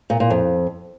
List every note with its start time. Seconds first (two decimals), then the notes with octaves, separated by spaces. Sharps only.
0.10 A#2
0.20 A#2
0.30 F2